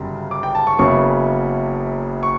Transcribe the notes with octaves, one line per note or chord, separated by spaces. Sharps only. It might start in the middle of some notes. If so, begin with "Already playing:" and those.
Already playing: G1 F#2 C#3 G3
D6
G5
A5
C#6
F#1 F#2 C#3 F#3 B3 C#6
C#6